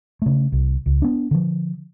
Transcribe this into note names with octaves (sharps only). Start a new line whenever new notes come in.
C#3 A3
C2
C#2
B3 D4
D3 F3